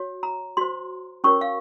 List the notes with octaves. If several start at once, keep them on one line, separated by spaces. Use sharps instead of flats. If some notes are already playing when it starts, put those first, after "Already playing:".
Already playing: F#4 C#5
A#5
F#4 C5 C6
C#4 F#4 A#4 C#5 C#6
F5